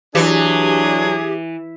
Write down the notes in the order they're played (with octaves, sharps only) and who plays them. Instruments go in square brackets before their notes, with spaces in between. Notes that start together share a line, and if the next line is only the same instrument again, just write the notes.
[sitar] E3 [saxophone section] F#3 D4 [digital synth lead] G4 [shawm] G#4